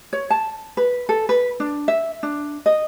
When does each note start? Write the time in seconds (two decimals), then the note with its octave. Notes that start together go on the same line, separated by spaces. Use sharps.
0.13 C#5
0.30 A5
0.77 B4
1.09 A4
1.29 B4
1.60 D4
1.88 E5
2.23 D4
2.66 D#5